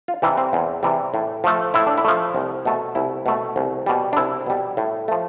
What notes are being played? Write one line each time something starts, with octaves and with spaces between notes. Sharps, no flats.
F4
C3 E3 G3 E4
C4
E2
C3 E3 G3
A2
F3 A3
A2 E4
D4
E4
F3 A3
C2
B2 A3
C2 E4
B2 A3
C2
B2 G3
D4
C2 E4
B2 G3
A2
F3 A3